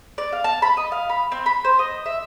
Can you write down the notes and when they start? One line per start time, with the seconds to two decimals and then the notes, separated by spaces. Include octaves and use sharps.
0.18 D5
0.33 F5
0.44 A5
0.62 B5
0.77 D#5
0.92 F5
1.09 B5
1.32 C4
1.46 B5
1.64 C5
1.79 D#5
2.06 E5